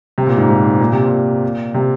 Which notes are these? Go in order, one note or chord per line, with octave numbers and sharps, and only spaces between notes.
C3
A#2
G#2
G#2
A#2
C3
A#2
C3